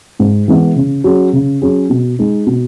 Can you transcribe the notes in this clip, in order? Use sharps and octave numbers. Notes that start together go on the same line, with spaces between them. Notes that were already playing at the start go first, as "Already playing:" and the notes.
G#2
E3 G#3 B3 E4
C#3
F#3 C#4 G#4
C#3
F#3 C#4 G#4
B2
G#3 D#4
B2